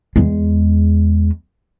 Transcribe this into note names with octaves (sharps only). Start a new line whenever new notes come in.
E2 G#3